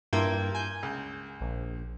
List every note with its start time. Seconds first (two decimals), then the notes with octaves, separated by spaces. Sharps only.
0.13 G2 A#3 E4 F4 G5 G#6
0.55 G#5 G6
0.83 C#2
1.40 A#1